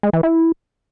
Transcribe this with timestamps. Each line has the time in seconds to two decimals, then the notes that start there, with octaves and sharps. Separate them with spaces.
0.03 G#3
0.13 E3
0.23 E4